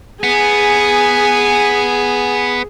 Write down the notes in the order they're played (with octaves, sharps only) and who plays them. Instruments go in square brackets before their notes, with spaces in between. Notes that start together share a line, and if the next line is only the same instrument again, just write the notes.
[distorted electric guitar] B3 [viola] G#4 [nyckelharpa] G#5